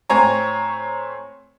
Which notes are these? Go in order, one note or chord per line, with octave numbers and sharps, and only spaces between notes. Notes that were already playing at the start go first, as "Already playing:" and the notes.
A2 C4 C#5 G#5 A#5